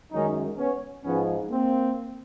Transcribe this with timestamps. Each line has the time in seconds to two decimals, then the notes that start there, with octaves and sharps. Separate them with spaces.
0.12 F#2 D#3 G#3 C#4 D#4
0.57 B3 C#4
1.04 G#2 F3 G#3 B3 C#4
1.50 A#3 C4